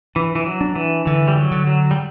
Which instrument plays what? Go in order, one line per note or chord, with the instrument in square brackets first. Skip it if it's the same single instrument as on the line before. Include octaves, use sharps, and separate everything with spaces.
[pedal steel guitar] E3 [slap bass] D4
[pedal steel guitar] E3
F#3
[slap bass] D4
[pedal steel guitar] E3
[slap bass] D3 [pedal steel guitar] E3
[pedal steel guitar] G3
F#3
[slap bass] D3
[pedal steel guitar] F#3
G3